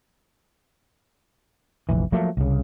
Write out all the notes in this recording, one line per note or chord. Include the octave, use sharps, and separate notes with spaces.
F1 A#1 E3
F3 F#3 A3 A#3
C2 C#3